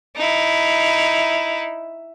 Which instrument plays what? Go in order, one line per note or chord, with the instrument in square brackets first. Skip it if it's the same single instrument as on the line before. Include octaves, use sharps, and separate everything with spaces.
[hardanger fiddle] D#4 E4